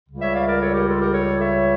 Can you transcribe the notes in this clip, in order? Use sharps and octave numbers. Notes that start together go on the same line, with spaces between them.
C#2 C#3 G3
C#5 E5
D5 F5
A#4 D5
A4 C#5
G4 A#4
F4 A4
G4 A#4
A4 C#5
C#5 E5